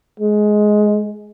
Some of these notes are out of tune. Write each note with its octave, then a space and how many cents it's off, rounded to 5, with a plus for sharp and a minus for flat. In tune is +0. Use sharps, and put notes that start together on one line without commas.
G#3 +15